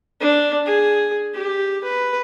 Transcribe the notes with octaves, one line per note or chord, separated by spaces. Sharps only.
D4
G#4
G4
B4